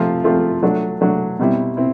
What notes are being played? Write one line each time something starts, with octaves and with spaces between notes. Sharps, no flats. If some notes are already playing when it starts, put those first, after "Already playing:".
Already playing: C3 F3 A3 C4 F4
C3 F3 A3 C4 F4
F#3 A3 D4
F#3 A3 D4
B2 G3 C4 E4
C4 E4